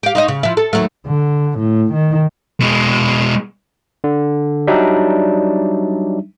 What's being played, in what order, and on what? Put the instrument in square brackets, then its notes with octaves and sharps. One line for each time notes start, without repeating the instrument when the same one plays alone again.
[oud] G4 F5
D#4 C5 D#5
C#3
F3 E4
A4
D#2 F#3 A3
[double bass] D3
A2
D#3
[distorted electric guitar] B2 G#3
[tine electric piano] D3
F#3 G3 D4 D#4 E5